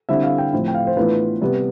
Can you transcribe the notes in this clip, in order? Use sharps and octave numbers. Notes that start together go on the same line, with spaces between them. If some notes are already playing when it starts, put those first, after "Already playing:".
D3 G3 C4 E4 E5
F5
G5
A2 F3 C4 E4
G5
F5
C5
A2 E3 B3 D4 F4 B4
C3 G3 B3